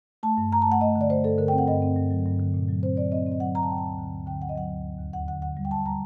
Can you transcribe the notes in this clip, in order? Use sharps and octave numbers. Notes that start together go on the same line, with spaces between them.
A3 A5
G2
G2 A#5
A5
A3 F#5
A3 D#5
D3
D5
A3 C5
G2 A4
D3 A#4
G5
C4
F#5
G2 D#5
C4
G2
F#3
G2
D3
A#2
F#3
C4 C5
F#3 D5
C4 D#5
C4
D#5
F#3 F#5
A#2 A#5
A5
D3 G5
A5
D2
D3
D2
D3 G5
D2 F#5
D#5
F#3 F#5
D2
D#2
D#2
D#2 F#5
D3 F#5
D3 F#5
G3
G5
G3 A5
G3 A#5